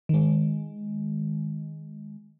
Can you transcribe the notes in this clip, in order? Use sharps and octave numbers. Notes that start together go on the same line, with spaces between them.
D#3 G#3